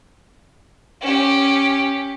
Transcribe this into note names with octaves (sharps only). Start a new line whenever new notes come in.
C#4 G4